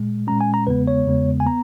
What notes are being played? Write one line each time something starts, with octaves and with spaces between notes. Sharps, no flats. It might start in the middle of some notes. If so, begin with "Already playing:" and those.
Already playing: A#2 G#3
A#2 G#3 C#4 A#5
G#5
A#5
E2 C#3 G#3 B3 B4
C#5
E2 C#3 G#3 B3
G#5
B3 A#5